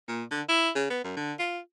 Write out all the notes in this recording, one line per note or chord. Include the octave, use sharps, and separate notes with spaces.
A#2
D3
E4
C#3
B3
F#2
D3
F4